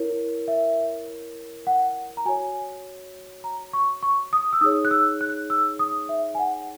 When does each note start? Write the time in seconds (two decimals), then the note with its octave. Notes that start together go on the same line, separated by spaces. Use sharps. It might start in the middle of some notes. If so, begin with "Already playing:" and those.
Already playing: E4 A#4 C#5
0.48 E5
1.67 F#5
2.17 A#5
2.25 F#4 C#5 G#5
3.44 A#5
3.73 C#6
4.03 C#6
4.33 D#6
4.53 E6
4.61 D#4 G#4 C#5 D#6
4.85 F#6
4.91 E6
5.21 F#6
5.50 E6
5.79 D#6
6.09 E5
6.35 G#5
6.39 F#5